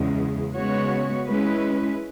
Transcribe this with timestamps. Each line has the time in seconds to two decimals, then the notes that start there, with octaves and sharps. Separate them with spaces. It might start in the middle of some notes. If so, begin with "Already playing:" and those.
Already playing: E2 C#3 G#3
0.55 C#3 G#3 B3 F#4 C#5
1.27 G#3 C#4 E4 B4